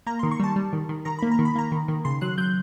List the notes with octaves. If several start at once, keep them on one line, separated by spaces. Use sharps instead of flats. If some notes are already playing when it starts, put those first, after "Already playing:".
A#3 A#5
D#3 C6
C#6
G3 A5
G3
D#3
D#3
D#3 A#5
A#3 B5
A#5
D#3
B5
A#3 A#5
D#3
D#3
C#3 C6
F#3 F#6
F#3 G6